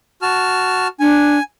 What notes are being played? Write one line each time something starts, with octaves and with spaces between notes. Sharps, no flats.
F#4 A5 F6
D4 G#5